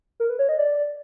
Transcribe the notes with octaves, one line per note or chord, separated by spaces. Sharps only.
A#4
B4
C#5
D#5
D5